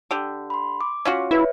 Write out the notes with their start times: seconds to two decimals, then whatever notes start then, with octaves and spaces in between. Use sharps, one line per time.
0.11 D3 G4
0.50 B5 C6
0.81 D6
1.05 C#4 F4 F#4
1.31 E4 B4 C#5 E5